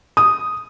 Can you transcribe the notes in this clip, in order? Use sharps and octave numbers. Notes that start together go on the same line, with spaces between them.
D#6